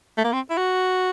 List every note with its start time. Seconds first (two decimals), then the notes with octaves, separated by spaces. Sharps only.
0.17 A3
0.24 A#3
0.33 C4
0.50 E4
0.57 F#4